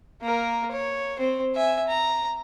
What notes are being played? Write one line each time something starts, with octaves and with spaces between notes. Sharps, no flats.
A#3 A#4
C#5
C4 C5
E5 G#5
A#5